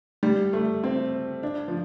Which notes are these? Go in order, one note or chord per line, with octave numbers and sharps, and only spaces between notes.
G3
A3
C4
D4
F3